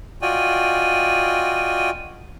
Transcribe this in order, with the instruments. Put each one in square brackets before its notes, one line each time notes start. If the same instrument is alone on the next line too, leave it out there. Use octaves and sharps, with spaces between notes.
[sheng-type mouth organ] F4 F#4 D5 D#5 G5 G#5